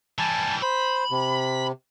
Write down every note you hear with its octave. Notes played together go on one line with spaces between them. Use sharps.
E3 G3 G#5 A5
C5 B5
C3